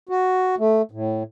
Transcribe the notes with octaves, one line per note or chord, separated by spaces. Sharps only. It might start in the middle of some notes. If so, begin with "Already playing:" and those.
F#4
A3
A2